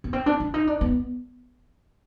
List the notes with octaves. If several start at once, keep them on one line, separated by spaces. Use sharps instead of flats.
B3
C4
D4
D4
D#4
D4
B3